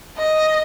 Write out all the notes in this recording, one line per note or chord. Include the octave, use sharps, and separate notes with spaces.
D#5